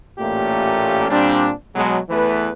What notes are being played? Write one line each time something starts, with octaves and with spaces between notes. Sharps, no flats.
A1 A#2 A3 A#3 C#4 G4
A#2 G3 C4 D4
B2 F#3 G#3
E2 E3 A3 B4